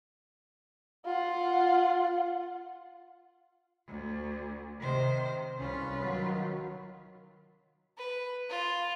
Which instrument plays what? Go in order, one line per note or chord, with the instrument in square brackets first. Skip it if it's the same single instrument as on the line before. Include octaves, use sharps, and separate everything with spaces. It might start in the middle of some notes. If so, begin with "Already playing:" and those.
[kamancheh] F4 F#5
[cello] D2
[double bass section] C3 [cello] D#3 C5
[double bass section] C2 C#4 [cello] F4 B4
[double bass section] D#3 F#3
[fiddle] B4
F4